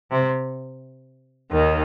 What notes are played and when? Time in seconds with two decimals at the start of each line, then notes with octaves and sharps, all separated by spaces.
0.10 C3
1.51 D#2 D#3